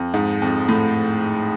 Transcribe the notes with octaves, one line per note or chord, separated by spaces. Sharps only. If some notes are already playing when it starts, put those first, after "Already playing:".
Already playing: F2
G#2
F2
A2